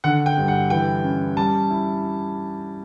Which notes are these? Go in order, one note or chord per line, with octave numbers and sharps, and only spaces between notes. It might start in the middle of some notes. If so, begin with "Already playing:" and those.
D3 F#5
G5
G2
F#5
E3 G5
C#4
G3 A5
E4